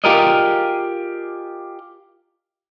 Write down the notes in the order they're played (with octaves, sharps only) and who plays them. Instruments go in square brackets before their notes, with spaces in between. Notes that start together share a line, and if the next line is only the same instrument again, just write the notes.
[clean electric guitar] F4 G4 G#4 A#4 D5 D#5